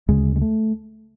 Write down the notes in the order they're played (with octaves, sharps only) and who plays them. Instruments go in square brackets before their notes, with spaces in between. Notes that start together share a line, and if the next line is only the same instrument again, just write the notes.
[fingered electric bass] D2 C#3 G#3
G#3
A3